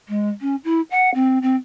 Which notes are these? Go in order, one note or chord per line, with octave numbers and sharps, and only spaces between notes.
G#3
C#4
E4
F#5
C4
C4